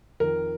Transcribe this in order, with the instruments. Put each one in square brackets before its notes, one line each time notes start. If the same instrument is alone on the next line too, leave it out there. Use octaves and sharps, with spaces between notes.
[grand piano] F2 D#3 A#4